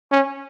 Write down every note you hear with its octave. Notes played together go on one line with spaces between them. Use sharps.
C#4